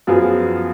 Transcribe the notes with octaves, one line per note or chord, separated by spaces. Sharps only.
F#2 F3 B3 F4 G#4